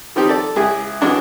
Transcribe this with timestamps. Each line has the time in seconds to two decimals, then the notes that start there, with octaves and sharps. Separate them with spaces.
0.16 D#3 F3 C4 D#4 G4
0.29 A4 D5
0.56 C#2 E4 G#4
1.01 C#2 E3 G#3 D4 F#4